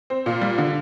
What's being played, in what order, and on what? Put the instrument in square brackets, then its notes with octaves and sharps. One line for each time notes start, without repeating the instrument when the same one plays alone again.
[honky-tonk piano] C4
A#2
G3
D3